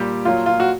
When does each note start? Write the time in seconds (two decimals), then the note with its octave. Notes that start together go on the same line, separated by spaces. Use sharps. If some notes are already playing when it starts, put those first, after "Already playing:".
Already playing: A#2 G3 G4
0.25 A#2 F#3 F4
0.46 F4
0.60 F#4